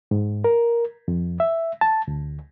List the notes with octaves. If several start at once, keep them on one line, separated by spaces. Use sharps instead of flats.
G#2
A#4
F2
E5
A5
D2